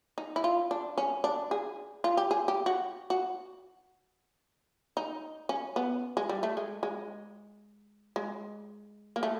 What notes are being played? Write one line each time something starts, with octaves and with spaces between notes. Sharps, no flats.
D#4
E4
F4
D4
C#4
D4
G#4
F4
G4
G#4
G4
F#4
F#4
D#4
C#4
B3
G#3
G3
A3
G#3
G#3
G#3
A#3
A3